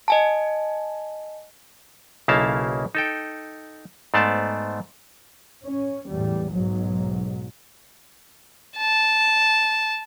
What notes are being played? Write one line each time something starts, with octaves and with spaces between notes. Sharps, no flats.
D#5 G#5 A5
B1 C#3 A#3 E4 F5 A5
D#4 A4 G5
G#2 A3 B3 C5 D5 A5
C#4
E2 A2 G3
B1 G#2 F#3
A5